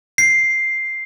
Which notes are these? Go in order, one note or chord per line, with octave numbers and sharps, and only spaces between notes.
C7